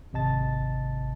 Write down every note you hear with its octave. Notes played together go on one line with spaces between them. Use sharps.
G#1 C3 D#5 A5 A6